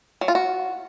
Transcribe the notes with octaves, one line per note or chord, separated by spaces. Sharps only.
F#3
F4
F#4